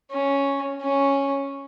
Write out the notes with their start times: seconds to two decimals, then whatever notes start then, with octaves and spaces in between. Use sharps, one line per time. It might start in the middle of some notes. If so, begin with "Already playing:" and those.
0.11 C#4
0.81 C#4